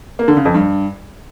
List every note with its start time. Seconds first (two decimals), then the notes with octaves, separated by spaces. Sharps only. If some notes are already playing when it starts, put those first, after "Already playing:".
0.19 A#3
0.28 D3
0.37 C#3
0.45 F2
0.54 G2